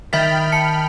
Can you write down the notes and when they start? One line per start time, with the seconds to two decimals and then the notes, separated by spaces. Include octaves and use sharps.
0.13 D#3 E5 G5 B5 F6 A6 B6
0.52 A5 C#7